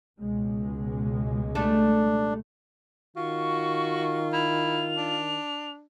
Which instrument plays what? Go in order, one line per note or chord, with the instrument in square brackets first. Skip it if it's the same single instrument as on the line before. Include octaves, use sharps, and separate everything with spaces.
[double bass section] C#2 B2 G#3
[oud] G3 A3 A4 [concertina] D4
[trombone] D#3 [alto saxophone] F4 [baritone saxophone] F#4 [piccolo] C#6
[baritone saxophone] E4 [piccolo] F7
[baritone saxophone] D4